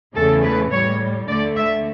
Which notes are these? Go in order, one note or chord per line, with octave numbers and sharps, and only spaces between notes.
E2 C#3 E3 A3 A4
B4
A2 G3 C#5
D2 D3 A3 D5
E5